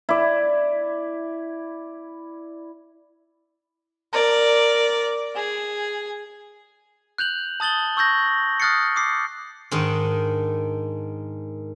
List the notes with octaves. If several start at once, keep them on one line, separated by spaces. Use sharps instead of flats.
E4 D5
A#4 D5
G#4
F#6 G6 F7 F#7
A5 D#6 A6 F#7 G7
C#6 E6 G6 A#6
D#6 F6 F#6 A6 C7 C#7
D6 D#6 C7
G#2 D#3 D4